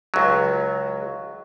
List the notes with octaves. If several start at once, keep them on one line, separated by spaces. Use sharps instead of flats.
C#2 F#3